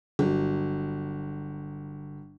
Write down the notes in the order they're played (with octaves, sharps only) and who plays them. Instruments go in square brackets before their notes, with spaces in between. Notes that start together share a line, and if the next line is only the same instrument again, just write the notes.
[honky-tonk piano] G1 F#3